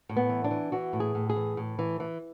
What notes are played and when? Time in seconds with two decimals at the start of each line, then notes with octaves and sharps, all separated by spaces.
0.09 A2
0.16 B3
0.29 E3
0.44 D4
0.51 E3
0.72 E3 F#4
0.93 A2
1.00 G#4
1.15 A2
1.30 G#4
1.36 E3
1.57 A2
1.79 E3
2.00 E3